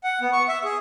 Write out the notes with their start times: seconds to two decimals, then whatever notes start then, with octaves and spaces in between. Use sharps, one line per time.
0.04 F#5
0.21 B3
0.33 C#6
0.48 E5
0.64 G#4